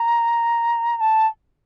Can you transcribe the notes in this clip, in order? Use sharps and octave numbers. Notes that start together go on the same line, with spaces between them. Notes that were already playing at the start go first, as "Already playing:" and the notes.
Already playing: A#5
A#5
A5